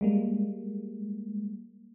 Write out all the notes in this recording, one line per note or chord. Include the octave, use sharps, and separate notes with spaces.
G3 G#3 A#3